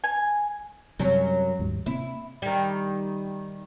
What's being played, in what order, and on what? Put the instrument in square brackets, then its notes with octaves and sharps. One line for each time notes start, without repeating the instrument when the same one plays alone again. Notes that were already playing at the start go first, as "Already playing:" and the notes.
[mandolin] G#5
[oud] F#2 F#3 C#4 [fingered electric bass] C3 G3
[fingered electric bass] D#2 G#2 G3
[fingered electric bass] C3 A#3 C4 [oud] E4
[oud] D#3 G3